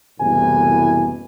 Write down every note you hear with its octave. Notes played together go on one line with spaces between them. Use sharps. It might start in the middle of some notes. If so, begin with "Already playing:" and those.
F#1 C2 A2 E3 B3 G#5